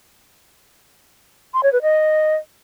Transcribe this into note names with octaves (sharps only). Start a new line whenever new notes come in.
C6
C#5
B4
D#5